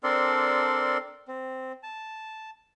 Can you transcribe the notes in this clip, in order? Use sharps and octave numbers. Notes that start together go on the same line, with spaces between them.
C4 D4 A4 A#4 D5 C6
C4
A5